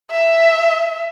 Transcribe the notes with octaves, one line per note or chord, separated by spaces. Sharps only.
E5